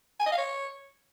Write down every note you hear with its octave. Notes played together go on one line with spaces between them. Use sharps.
G#5
D#5
F5
C#5